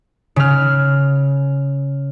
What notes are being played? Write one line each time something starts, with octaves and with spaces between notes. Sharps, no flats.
C#3 F6